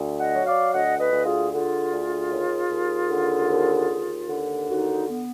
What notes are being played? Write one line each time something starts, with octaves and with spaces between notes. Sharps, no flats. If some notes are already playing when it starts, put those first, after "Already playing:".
Already playing: D2
D#5 F#5
F#3
D5 F5
D2 D#5 F#5
B4 D#5
D2
F4 G#4
D3 F4 G#4
D2
D#2
D#2
D3
D#2
D#2
D3
D#2 D#4 F#4
B3